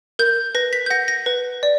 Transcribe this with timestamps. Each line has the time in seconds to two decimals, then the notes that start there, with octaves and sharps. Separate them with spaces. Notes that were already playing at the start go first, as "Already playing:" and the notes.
0.19 A#4 G6
0.55 B4 A#6
0.73 B6
0.86 G6
0.90 F#5 A#6
1.08 A#6
1.26 B4
1.63 D5